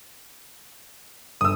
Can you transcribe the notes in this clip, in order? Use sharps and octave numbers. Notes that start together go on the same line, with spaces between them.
G1 D#6 E6